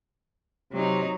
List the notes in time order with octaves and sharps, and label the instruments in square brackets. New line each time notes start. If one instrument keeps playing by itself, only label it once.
[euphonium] C3 [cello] F#3 D#4